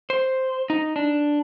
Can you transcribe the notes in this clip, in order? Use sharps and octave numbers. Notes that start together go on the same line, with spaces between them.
C5
D#4
D4